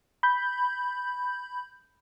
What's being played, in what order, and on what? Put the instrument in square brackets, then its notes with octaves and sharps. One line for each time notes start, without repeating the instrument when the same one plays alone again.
[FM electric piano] B5 G6